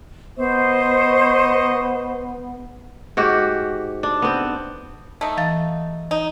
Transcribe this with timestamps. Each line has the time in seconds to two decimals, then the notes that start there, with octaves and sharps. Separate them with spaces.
0.37 B3 C5 D#5 C#6
3.17 G#2 F#4 G4
4.03 D4
4.22 B3 C4
5.21 A3 D#4
5.37 E3 F5 A6
6.11 D#4